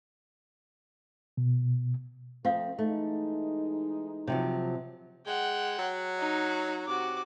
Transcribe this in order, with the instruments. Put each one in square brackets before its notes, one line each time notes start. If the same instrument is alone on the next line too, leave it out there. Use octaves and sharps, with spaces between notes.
[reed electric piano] B2
[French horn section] F3 A3 [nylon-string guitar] C4 [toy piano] F4 F5 D#6
[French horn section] E3 G#3 D#4 [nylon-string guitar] A3
[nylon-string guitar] C3 F3 F#3 [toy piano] C#5 G5
[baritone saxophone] G#3 [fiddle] F#5 G5
[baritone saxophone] F#3
[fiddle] D#4
[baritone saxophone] C3 [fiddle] F#4 D6